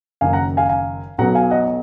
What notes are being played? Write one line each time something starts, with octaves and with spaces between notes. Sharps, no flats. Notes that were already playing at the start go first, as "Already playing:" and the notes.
F#1 F#2 D#3 F5 G#5
F#5 A#5
F5 G#5
F5 G#5
B1 B2 F#3 B3 F#5 A#5
F5 G#5
D#5 F#5
D#5